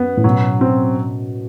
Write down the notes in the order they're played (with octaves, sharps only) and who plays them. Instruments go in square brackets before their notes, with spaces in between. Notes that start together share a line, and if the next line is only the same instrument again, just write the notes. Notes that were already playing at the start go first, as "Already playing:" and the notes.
Already playing: [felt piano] F#2 [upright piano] B3
[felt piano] A2
[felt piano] B2 [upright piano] F#3
[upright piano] C4